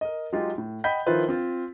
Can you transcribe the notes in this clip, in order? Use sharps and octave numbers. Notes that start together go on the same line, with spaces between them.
A#4 D#5
F#3 G#3 D#4 F4 G4
A2
D#5 F#5 G5 B5 G6 B6
D#3 F3 E4 F4 B4 C5
C4 F4